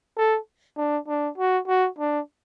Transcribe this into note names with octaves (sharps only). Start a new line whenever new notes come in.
A4
D4
D4
F#4
F#4
D4